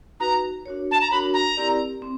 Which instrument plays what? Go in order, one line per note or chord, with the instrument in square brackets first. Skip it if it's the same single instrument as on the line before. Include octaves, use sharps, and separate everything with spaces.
[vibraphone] D#4 F#4 B4 [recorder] A#5
[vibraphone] D4 F#4 A#4 C#5
[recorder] A5
A#5
[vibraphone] D4 F#4 A#4 C#5 [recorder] B5
[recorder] A#5
[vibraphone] C4 E4 G4 A#4 D5
C4